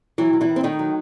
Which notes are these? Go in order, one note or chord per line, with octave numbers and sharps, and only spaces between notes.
E3 F#3 E4
D#3
E3 E4
D#3
C4
D#3 A3 D#4
F#3